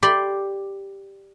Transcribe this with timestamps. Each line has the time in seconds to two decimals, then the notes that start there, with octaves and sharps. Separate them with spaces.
0.03 G4 D5 B5 C6